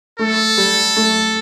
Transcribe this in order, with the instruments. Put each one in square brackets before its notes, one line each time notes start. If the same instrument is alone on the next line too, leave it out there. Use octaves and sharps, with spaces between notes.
[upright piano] A3 [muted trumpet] A4
[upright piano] G3
A3